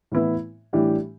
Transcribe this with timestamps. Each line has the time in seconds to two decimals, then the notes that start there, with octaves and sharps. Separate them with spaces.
0.12 A2 E3 B3 E4 B4
0.73 A2 E3 G3 D4 G4